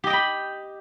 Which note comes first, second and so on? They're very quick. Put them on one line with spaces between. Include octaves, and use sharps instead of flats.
G4 D#5 G5 B5